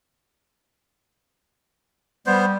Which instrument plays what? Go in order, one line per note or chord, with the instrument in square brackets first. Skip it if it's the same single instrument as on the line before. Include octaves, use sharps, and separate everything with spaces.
[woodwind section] G3 [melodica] B3 C5